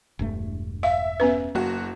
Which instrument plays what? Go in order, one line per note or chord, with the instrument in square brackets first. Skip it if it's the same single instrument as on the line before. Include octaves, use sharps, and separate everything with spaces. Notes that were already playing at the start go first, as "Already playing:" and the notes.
[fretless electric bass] E1 G2 A3
[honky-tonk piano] E5 [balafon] F5
[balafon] B3 C#4 B4
[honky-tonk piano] F#1 F#4 [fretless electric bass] A#3